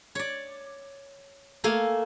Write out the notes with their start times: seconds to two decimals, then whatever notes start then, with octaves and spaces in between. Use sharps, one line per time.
0.15 C#5 D5
1.64 A3 A#3 F5 G#5